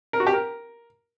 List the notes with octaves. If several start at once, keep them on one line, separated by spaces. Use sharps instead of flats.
A#4
F#4
G4
A#4